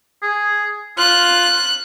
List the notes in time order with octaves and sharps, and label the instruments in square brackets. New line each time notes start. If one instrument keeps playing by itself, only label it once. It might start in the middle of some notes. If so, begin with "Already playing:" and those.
[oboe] G#4
[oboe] F4 [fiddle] F#6